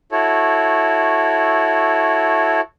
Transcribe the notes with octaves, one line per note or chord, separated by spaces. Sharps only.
E4 F#4 A4 C#5